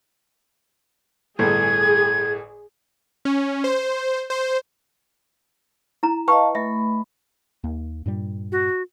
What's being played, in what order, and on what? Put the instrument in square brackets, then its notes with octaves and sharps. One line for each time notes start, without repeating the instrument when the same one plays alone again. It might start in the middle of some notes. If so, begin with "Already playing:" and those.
[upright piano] G1 A2 [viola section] G#4 [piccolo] G#6
[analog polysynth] C#4
C5
C5
[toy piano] E4 A#5
[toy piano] B4 G5 C#6 [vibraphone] D#5 F5 A5
[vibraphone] A3 B5 [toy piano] D#5 E5
[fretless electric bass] D#2 A#3
G2 A#2 G3
[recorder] F#4